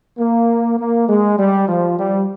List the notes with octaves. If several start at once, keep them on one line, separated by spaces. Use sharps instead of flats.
A#3
A#3
G#3
G3
F3
G3